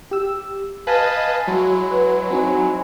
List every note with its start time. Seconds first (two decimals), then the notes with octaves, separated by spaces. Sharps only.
0.11 G4 E6
0.87 B4 D#5 F5 G#5 A5 B5
1.48 F#3 G#3 E4
1.91 B4
2.31 C4 D#4 G#5